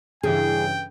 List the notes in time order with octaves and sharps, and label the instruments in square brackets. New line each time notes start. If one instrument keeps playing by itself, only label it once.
[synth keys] G2 C#3 E3 [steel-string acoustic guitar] G#4 [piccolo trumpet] G5